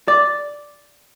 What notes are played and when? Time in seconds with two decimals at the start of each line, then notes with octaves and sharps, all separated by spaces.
0.08 D5